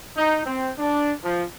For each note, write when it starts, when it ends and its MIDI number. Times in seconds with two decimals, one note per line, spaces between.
0.16 0.43 63
0.46 0.72 60
0.79 1.14 62
1.23 1.44 53